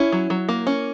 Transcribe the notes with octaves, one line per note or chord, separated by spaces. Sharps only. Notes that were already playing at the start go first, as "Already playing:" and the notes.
Already playing: C#4 E4
F#3
F#3
A#3
C#4